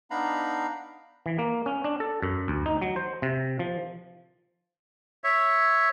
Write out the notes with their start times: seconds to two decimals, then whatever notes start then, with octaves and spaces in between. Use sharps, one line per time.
0.11 B3 D4 D#4 F5 A#5 B5
1.26 E3
1.38 A#3
1.66 C#4
1.84 D4
2.00 A4
2.22 F#2
2.48 D2
2.66 D#4
2.82 F#3
2.96 C5
3.22 C3
3.59 F3
5.24 C#5 E5